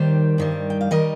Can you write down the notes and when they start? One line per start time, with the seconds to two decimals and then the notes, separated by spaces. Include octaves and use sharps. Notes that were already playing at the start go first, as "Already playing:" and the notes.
Already playing: D#2 D#3 G3 G4 C5
0.38 G2 D#3 G3
0.70 G5
0.81 F5
0.91 D#3 G3 A#4 D#5